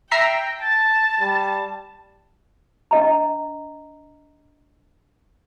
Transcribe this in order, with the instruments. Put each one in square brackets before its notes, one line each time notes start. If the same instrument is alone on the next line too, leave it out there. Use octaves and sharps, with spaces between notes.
[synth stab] E5 A#5 C7 [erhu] G5 [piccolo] A#6
[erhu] A5 [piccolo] A6
[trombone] G3
[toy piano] D4 D#5 A#5